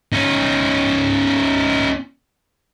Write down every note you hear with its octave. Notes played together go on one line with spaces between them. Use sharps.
C#4 D#4